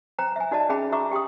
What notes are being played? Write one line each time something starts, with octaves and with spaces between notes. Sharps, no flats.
C5 G5 A#5
E5 G#5
D#4 F#4 D5 D#5 A5
C#4 G#4 E5 G5 B5
F#4 E5 A#5 C#6 D6
G4 G5 C6 D#6